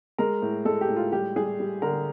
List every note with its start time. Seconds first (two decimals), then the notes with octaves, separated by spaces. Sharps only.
0.18 G#3 A#4
0.42 A2
0.65 G#3 A4
0.81 G4
0.89 A2
0.96 F4
1.12 G3 G4
1.36 G3 G#4
1.60 G3
1.82 D3 A#4